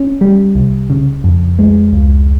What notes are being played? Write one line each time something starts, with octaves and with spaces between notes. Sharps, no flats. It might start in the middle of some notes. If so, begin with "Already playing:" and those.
Already playing: C#4
G3
C2
C#3
F2
G#3
C#2